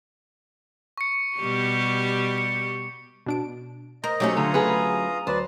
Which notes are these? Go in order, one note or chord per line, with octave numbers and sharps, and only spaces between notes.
C#6 C#7
B2 G3 G4
C#7
B2 D4 D7
A#4 C5 D#5
F#3 A3 C#4 D#4 G4 C5
D3 F4 A#5 D#6
D3 G#4 B4 F#5 G#5
D2 F#3 B4 C5 D5